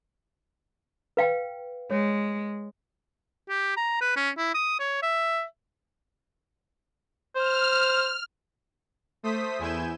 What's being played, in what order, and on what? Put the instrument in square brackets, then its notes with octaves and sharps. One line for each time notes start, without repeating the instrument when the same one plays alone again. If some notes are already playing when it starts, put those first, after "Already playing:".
[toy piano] B4 F5 G5
[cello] G#3 [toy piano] C#5
[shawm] G4
A#5
B4
C#4
E4
D#6
C#5
E5
[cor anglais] C5 [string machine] F6
[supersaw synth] A3 C5 D#6 B6
E2 E4 G#5 G6 E7